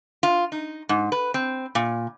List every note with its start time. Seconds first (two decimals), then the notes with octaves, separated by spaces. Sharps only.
0.23 F4
0.52 D#4
0.89 G#2
1.12 B4
1.34 C4
1.75 A#2